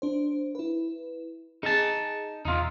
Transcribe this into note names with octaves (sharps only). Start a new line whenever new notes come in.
D4 C5
E4 B4
D#4 G#4 G#5 A5
E2 B2 D#4 F4 E6